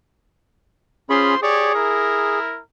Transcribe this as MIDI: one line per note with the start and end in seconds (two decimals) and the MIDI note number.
1.10 1.35 61
1.10 1.37 65
1.10 1.35 68
1.10 1.37 72
1.10 1.35 83
1.10 1.37 84
1.42 1.74 67
1.42 2.39 68
1.42 1.74 73
1.42 1.74 74
1.75 2.60 64
1.75 2.60 70